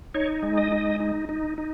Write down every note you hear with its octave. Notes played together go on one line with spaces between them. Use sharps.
D#4 C#5
G#3
D#5
D#4
D#4
D#4
D#4